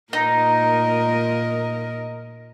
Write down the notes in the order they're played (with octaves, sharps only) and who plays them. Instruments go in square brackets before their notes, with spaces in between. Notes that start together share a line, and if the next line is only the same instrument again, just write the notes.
[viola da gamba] A#2 A#4 D#5 [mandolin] D#4